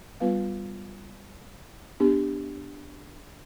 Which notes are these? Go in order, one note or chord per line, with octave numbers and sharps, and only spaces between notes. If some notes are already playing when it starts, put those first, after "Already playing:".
G3 B3 F4 B4 F5
B3 D4 G4